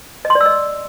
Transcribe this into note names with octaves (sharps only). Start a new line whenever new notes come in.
D#5
C6
D5
E6
D#5